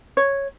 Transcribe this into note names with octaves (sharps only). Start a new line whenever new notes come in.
C#5